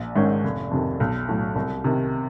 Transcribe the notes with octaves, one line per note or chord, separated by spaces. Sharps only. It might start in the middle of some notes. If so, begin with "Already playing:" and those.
Already playing: A#1
G#2 D#3 G#3 C#4
F1
F2 C3 D#3
B1
A2 F#3
C2
C3 D#3